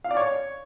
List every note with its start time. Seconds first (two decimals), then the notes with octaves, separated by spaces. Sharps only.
0.04 F5
0.11 D5
0.17 C#5